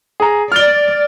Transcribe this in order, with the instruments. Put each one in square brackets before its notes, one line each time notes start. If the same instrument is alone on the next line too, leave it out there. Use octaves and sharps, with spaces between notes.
[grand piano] G#4 A#5
[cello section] D5 [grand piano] F6 G7